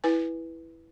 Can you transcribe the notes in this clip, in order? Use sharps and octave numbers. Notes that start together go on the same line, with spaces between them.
E4 B4 G#5